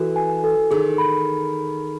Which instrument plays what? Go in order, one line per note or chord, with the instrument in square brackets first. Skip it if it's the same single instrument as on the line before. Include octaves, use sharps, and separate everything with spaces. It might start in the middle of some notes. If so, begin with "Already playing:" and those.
Already playing: [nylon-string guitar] E3 [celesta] F#4 A4
[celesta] G#5
A4
[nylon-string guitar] D#3 [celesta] G#4
[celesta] B5